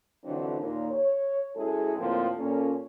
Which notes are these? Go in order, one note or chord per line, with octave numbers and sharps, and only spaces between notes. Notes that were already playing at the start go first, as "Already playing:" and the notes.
F2 D3 E3 F#3 C4 D4
D#2 A#2
C#5
F#2 G#3 E4 G#4 A4
D2 A2 F3 A#3 C4
A#2 C#4 A4